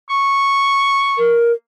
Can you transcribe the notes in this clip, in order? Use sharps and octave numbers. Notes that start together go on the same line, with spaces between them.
C#6
A#4